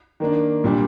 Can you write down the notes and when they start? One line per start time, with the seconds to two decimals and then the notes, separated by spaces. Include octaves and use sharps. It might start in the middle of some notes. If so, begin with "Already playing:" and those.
0.20 D#3 A#3 D4
0.64 A#2 G3 D4